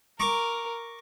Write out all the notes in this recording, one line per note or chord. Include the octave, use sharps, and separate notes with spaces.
A#4 A#5 C#6 D6